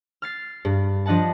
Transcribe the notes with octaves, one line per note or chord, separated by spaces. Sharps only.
F6 A6 C7
G2
F3 D4 D#5 F#5 A5